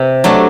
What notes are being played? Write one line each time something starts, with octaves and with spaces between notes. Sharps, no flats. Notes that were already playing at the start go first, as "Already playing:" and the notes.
Already playing: C3
F#3 A3 D4